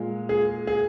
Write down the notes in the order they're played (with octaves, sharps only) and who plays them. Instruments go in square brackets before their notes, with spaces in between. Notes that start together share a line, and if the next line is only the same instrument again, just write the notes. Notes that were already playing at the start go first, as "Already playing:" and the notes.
Already playing: [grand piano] A#2 G#3
G#4
G#4